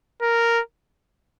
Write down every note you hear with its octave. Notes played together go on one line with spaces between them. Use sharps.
A#4